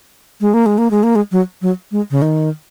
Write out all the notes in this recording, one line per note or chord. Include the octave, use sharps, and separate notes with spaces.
G#3
A#3
G#3
A#3
G#3
A#3
G#3
F#3
F#3
G#3
C#3
D#3